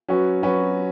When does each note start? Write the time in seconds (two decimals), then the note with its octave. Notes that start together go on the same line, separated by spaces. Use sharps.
0.08 F#3 C#4 F#4 B4
0.43 F#3 C#4 F#4 B4